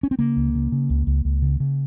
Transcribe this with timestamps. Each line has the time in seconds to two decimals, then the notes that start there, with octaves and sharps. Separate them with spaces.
0.03 C#4
0.11 C4
0.19 C#3 A#3
0.36 C#2
0.55 C#3
0.72 C#3
0.90 C#2
1.07 C#2
1.25 C#2
1.42 C#3
1.60 C#3